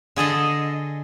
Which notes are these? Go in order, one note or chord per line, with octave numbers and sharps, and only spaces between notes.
D3 G#4 A4 D#5